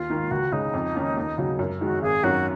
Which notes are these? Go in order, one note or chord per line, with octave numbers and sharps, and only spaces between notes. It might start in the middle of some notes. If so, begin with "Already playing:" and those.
Already playing: D#2 F4
D#3 A#3
C#2 F#4
C#3 G#3 D#4
F2
D#3 A#3 C#4
D#2
C#3 F#3
F#2
D#3 G#3 F#4
G#1 G#4
F#2 D#3 F#3 C#4 F#4